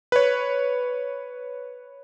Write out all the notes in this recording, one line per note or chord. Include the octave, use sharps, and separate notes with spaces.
B4 C#5